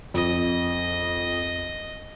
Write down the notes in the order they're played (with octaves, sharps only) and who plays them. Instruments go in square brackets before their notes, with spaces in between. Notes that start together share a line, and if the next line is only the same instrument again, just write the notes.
[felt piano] F2 [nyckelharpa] D#5